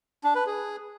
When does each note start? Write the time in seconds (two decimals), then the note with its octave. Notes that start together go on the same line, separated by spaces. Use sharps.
0.24 D4
0.35 B4
0.46 G#4